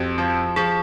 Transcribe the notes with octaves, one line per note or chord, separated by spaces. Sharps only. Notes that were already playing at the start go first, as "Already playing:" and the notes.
Already playing: F2 F#4 G4
F3
F3 G#4